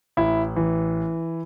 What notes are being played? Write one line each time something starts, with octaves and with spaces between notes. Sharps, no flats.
A1 E4
E3